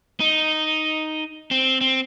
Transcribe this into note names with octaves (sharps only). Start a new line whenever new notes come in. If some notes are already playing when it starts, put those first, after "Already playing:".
D#4
C4
C4